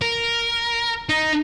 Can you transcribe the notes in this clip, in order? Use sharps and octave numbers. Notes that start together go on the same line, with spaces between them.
A#4
D#4